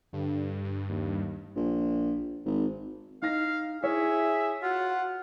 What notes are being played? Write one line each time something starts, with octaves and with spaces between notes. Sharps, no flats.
G2 D3
D#2
A#1
G#1
D#4 F5 A#6
E4 G#4 C#5 E5
F4 F#4 F#5